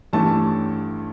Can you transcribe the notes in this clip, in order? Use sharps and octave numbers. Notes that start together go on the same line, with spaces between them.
A1 G2 E3 A3 A5